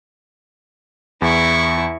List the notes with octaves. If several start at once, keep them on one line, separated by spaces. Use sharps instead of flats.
E2 E4 C#6